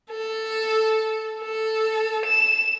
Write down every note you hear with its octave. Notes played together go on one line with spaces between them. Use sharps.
A4
A4
E7